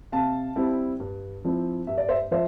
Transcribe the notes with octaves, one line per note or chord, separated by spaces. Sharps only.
C3 F5 A5
G3 C4 E4
G2
F3 C4 E4
G2 E5
D5
C5 E5
F3 C5 E5